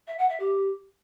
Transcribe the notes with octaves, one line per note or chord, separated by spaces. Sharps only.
E5
F#5
E5
G4